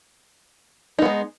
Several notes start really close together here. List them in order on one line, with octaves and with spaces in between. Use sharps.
D#4 B3 G#3